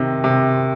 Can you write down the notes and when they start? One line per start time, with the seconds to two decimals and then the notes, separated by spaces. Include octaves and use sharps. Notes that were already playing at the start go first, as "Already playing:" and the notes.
Already playing: C3 D#3
0.24 C3